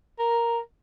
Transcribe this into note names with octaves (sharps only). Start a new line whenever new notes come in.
A#4